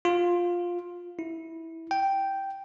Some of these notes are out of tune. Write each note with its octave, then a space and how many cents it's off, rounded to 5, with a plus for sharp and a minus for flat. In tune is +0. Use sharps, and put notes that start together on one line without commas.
F4 +10
E4 -15
G5 -5